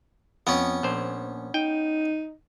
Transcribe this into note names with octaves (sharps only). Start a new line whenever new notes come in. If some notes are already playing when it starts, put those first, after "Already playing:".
F2 B3 C#4
A#1 C5
D#4 G5